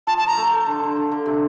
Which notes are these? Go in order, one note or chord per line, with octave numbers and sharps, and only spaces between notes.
F3 A5
F3 A5
A#5
A3
A3
D3
D3
D3
D3
C3